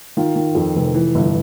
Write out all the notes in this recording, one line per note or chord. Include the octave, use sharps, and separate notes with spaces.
D#3 F4
D#3
F2
F1
E3
G1